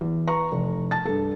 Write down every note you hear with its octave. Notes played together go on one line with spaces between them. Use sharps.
E2
B4 A#5 C#6
F1
A5 A6
G2 A4